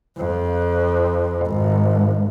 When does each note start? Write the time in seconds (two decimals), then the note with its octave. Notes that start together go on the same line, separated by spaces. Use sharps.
0.17 F2
1.46 G#1